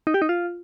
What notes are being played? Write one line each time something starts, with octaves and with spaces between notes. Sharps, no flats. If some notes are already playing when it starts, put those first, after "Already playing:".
D#4
G4
D#4
F4